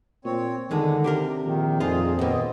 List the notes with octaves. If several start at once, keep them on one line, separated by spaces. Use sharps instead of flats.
A#2 C4 C#5
E2 D3 D#3 G#3 D4
C3 D4 G4 A#4
A#1 D#3
F2 F3 D#4 F4 G#4
D#2 A#2 B3 C4 D#5